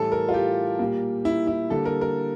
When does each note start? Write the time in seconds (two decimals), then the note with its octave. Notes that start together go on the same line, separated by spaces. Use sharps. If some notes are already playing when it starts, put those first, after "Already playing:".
Already playing: A2 E3 G3 A4
0.12 A#4
0.29 F4
0.34 G4
0.79 A#2 G3 A#3
1.25 E4
1.47 E4
1.70 D3 G3 A#3 A4
1.85 A#4
2.01 A#4